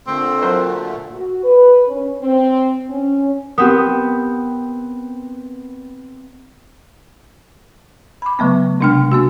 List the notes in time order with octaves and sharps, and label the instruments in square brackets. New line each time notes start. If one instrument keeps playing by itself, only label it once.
[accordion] A#2 D3 A3 [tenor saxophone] C4
[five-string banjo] F#3 A#4 C5
[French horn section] F#4
B4
C#4
C4
C#4
[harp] B3 C4 [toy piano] G4 D#6 [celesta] A#4 F#5
[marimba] B5 D6
C#3 F#3 A3 B3
C3 G#3 D4 G5 F6
A#3 D4 F#4